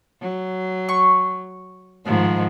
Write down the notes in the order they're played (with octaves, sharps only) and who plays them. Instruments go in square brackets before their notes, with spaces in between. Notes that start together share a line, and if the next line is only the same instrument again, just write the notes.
[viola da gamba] F#3
[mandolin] C#6
[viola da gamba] G#2 D#3 F3